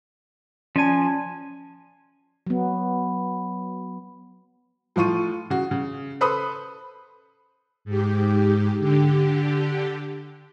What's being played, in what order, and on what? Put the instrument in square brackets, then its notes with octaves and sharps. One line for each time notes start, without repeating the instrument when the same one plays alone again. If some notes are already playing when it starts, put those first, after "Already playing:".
[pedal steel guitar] F3 G#5 [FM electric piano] C#4 D5 A5
[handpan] F#3 B3
[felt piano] A2 F3 F4 C#6 D#7
C#3 F#4
C#3
A4 B4 C5 B5 D#6
[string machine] G#2 G4
D3 G4